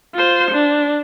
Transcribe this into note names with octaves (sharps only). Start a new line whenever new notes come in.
F4 C5
D4